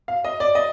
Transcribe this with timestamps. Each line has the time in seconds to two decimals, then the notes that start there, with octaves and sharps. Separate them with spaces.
0.08 F5
0.25 D#5
0.40 D5
0.55 D#5